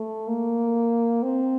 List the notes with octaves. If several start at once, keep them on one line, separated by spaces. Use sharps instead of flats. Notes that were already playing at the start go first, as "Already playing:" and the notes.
Already playing: A3
A#3
C4